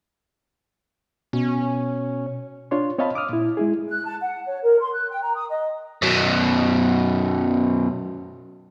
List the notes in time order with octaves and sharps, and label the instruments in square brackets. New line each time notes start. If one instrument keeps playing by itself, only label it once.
[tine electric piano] B2 [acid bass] C#4
[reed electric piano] D4 F4 C#5 C6
C4 C#5 D#5 F5 A5 B5
D6 D#6 F6
A#2 E4
G#3 E4 G#4
[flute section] F#6
A5
F#5
C#5
A#4
C6
F#6
G5
A#5
D#6
D#5
[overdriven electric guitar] F#2 B2